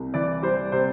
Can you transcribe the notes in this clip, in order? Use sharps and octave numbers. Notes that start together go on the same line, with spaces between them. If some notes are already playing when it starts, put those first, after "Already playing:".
Already playing: C2 C3
E3 D5
G3 C5
C3 C5